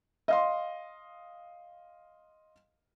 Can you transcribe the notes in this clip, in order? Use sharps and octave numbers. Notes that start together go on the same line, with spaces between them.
D#5 F5 C6